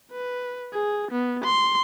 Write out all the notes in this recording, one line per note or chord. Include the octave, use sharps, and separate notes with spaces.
B4
G#4
B3
C6